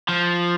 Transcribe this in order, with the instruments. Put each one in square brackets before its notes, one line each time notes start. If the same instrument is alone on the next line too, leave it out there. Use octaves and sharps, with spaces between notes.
[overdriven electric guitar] F3